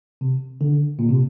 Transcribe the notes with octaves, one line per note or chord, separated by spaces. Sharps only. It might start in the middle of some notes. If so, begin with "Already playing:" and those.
C3
D3
A#2
C3